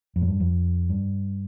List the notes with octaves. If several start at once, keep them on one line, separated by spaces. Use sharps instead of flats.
F2
A2
G2
F2
G2